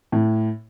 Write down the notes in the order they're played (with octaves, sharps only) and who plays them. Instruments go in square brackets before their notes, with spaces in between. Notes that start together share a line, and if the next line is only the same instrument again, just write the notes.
[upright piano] A2